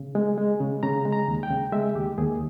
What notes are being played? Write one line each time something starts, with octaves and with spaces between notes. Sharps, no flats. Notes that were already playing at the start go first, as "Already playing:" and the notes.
Already playing: C#3
G#3
G#3
C#3
C#3 A#5
G#3
A#5
D#2
G5
C#3
G#3 E5
D#2 G4
D#2 G#4